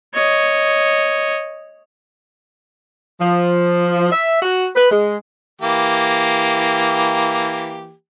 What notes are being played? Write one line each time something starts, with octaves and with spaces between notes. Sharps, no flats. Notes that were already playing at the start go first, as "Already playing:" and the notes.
C#5 D#5
F3
E5
F#4
B4
G#3
E3 A#3 G4